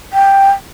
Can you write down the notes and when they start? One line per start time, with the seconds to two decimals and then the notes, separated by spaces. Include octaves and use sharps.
0.13 G5